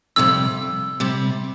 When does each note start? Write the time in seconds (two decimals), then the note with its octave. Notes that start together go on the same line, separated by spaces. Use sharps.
0.16 F2 C3 G3 E6
1.00 C3 G3